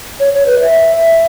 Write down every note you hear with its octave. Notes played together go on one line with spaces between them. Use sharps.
C#5
C#5
B4
E5